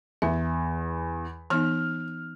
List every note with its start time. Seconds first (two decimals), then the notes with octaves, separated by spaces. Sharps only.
0.22 E2 E5
1.50 E3 B3 D#4 F6